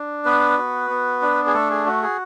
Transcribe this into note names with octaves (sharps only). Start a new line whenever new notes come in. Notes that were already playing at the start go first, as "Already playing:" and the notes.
Already playing: D4
B3 B4
F#4
B3
D4
G#4
A3 A4
G#4
F#4
G#4